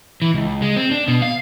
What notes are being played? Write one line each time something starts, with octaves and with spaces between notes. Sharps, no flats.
E3
C#2
G#3
C4
D4
B2
F5